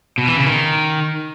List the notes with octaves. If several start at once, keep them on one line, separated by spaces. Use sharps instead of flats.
B2
E3
C#3
D#3